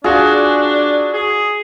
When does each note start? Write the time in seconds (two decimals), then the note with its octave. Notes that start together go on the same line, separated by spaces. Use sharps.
0.04 D4 F4 F#4 G#4
1.13 G#4